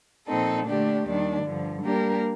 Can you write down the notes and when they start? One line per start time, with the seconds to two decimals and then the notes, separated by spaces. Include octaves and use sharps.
0.27 A#2 F3 C4 D#4 A4
0.66 D3 A3 D4 G4
1.05 D#2 D#3 G3 D4
1.44 G2 D3 F3
1.82 G3 A#3 D4 G4 A#4